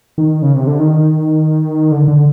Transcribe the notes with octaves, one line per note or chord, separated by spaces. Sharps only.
D#3
C#3
C3
D3
D#3
D3
D3